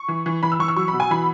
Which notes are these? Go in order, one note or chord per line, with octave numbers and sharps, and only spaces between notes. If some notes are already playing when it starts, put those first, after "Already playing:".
Already playing: C#6
E3
E3
E3 B5
E6
E3 C#6
E6
F#3 C#6
B5
B2
G#5
E3 B5